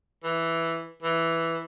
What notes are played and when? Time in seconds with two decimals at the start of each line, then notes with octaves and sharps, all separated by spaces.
0.24 E3
1.03 E3